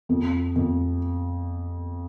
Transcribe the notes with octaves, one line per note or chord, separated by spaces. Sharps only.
F2
F2